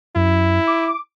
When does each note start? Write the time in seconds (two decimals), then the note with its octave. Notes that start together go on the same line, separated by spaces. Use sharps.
0.15 F#2 E4
0.67 D6